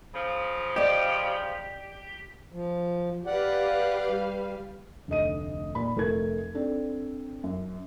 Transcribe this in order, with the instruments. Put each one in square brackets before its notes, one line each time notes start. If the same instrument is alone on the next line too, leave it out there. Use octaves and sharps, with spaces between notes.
[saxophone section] C#3 F3
[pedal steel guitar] G4 [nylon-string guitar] D5 D#5
[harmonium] F3
[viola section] G4 B4 F5 [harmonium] D5 F#5
[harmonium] G3
[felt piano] F1 D2 D#5 D#7
A#2 B5
F1 A3 A#4 G#6
C4 D4 A4
F#2